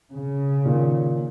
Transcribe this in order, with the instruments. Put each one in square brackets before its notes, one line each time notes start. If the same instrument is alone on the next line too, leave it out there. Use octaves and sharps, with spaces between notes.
[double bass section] C#3
[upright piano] A#2 D#3